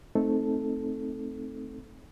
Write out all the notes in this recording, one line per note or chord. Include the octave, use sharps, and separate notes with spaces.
A3 C4 D#4 A4